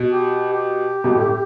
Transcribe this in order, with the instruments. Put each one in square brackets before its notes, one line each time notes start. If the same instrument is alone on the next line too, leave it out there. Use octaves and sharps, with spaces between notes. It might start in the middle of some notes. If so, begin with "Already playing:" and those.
Already playing: [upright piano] B2
[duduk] G4
G4
[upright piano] B2
A2
A2